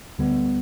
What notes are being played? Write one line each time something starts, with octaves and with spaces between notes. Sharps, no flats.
D2 D3 G3 B3